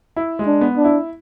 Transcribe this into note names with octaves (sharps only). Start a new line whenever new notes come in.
E4
G#3
D4
B3
D4
E4